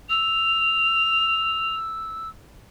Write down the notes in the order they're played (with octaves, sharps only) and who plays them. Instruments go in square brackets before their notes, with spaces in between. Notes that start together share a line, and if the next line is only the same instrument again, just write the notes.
[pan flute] E6 [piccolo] F7